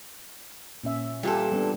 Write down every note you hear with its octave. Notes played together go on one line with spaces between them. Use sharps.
A#2 C#4 E5
A#2 E3 G3 F4 G4 A4
G3 B3 D4